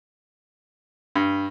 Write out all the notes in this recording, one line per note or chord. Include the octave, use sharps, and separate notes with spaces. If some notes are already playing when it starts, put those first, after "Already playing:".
G2